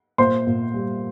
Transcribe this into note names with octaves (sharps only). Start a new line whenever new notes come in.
A#2 C5 C6
A#2
G3